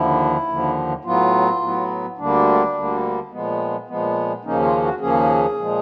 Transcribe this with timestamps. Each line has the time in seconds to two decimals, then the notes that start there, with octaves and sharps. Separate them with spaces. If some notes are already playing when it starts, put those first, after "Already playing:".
Already playing: D#2 D3 F3 E4
0.48 D#2 D3 F3
1.04 A2 F#3 B3 F4
1.61 A2 F#3 B3
2.18 D2 D3 G3 A#3 D4
2.74 D2 D3 G3 A#3
3.31 A#2 F3 G#3 B3
3.87 A#2 F3 G#3 B3
4.44 D#2 C#3 F3 A#3 C#4 D#4
4.63 F4
4.82 F#4
5.00 D#2 C#3 F3 A#3 C#4 G#4
5.58 A#2 F3 G#3